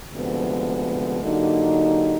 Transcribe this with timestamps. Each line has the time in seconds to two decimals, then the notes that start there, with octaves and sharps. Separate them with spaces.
0.12 D2 C3 F3 G#3 B3
1.22 D3 F#3 A#3 D#4 G4